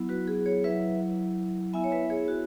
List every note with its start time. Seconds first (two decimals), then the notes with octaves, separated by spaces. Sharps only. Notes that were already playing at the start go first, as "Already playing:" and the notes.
Already playing: F#3 B3 E4
0.09 F#4 B4
0.28 G#4
0.46 G#4 C#5
0.64 F#3 E4 B4 E5
1.73 B3 E4 E5 G#5
1.84 C#5
1.92 B4 E5
2.10 G#4 C#5
2.28 F#4